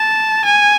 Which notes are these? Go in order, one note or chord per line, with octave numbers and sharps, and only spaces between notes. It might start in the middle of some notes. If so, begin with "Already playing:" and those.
Already playing: A5
G#5